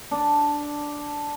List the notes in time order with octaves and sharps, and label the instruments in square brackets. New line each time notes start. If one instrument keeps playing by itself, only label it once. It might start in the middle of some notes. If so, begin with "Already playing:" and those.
[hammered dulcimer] D4